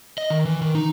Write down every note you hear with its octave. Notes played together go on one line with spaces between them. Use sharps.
D#5
D#3
E3
D#3
D#4